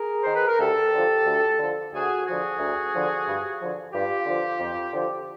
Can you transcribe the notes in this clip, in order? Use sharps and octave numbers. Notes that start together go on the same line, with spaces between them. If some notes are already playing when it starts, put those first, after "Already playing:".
Already playing: G#4 A#4
D#3 C5
B4
A#4
D2 G4 A4
D3 F3
D2
D3 F3
D2 F#4 G#4
D3 F3 F#4 G#4
D2
D3 F3
G2
D3 F3
G2 F4 G4
D3 F3
F2
D3 F3